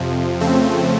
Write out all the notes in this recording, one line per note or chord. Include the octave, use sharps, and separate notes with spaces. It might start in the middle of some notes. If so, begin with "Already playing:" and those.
Already playing: F2 C3 F3
F2 C#3 F3 A3 C4